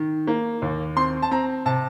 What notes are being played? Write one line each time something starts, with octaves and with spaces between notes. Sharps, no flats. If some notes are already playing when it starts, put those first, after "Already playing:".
Already playing: D#3
A#3
D#2
C4 C6
A5
C4 A#5
C3 A5